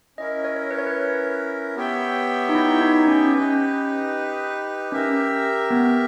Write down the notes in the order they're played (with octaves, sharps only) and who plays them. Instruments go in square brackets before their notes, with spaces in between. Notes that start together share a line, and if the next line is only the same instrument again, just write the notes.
[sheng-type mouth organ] C#4 E4 A#4 [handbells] D#5
[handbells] C#5
B4
C#5
B4
[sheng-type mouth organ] B3 G4 C#5 E5 G5
[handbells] D#4
E4
D#4
C#4
[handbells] C#4 [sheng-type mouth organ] D#4 G4 B4
[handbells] C#4 [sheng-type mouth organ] G4 A#4 E5
[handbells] B3